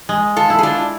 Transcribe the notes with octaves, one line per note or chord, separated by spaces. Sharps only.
G#3
F4 A4
E4
G#4
D4 F4